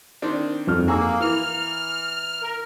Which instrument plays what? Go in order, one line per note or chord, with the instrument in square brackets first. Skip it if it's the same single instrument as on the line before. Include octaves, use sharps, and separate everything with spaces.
[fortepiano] D#3 C4 D4
[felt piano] F2 D#4 F6
[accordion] A#3 [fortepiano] F#4 G#4 [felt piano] A#5 E6
[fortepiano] E3 [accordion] F6
[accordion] A#4